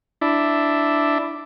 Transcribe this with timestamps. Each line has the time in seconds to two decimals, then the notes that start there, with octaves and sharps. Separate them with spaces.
0.21 D4 E4